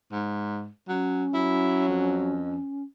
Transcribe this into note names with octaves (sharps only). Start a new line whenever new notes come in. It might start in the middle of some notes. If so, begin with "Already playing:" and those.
G#2
F#3 C#4
F#3 E4
F2